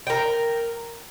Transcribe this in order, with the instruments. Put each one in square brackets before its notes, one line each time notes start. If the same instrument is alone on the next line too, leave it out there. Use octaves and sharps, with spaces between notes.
[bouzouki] A#4 G5